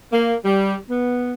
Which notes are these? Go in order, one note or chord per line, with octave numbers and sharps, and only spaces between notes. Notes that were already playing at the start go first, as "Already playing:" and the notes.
A#3
G3
B3